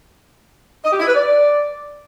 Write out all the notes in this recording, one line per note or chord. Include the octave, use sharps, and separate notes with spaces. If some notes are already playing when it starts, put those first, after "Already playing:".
D#5
G4
E4
B4
D5